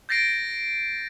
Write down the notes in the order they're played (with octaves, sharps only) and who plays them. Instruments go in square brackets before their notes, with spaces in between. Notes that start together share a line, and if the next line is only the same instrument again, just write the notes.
[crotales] G6 A6 A#6 C7 D7